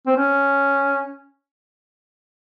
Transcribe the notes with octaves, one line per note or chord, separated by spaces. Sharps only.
C4
C#4